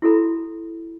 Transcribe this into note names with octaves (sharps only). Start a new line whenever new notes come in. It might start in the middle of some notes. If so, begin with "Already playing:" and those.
E4 F#4 A4 A#5 B5